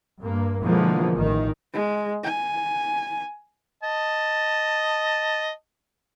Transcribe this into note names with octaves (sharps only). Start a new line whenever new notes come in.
G2 A#3
B2 D3 E3 F3 G#3 A#3
A1 D#3
G#3
G#5
D#5 A5